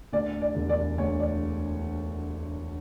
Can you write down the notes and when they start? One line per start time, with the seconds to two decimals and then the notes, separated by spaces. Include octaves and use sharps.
0.13 D2 D5
0.42 D5
0.55 E1
0.69 D5
0.98 D2 C#5
1.20 D5